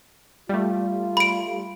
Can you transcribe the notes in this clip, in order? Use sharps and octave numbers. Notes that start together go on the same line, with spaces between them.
G3 A3 F4
B5 D7